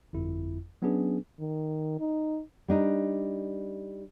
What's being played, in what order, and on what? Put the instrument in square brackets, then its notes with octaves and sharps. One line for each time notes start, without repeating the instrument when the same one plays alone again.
[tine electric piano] G1 F2 E4
F#3 B3 C#4 D4 G#4 B4
[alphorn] D#3
D#4
[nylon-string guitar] G3 D4 D#4